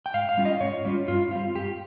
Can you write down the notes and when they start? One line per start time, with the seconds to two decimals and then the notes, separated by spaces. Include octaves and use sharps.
0.06 G5
0.14 G#2 F5
0.29 F5
0.37 G3 C#4 F4
0.45 D#5
0.60 G#2 C#5
0.85 G3 C#4 F4
1.07 G2 F4
1.31 G3 C4 F4
1.55 G2 G4